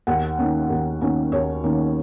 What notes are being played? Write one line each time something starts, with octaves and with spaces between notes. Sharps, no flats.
D#2 F#5
D#3 A#3 C#4
D#2
D#3 A#3 C#4
D#2 C#5
D#3 A#3 C#4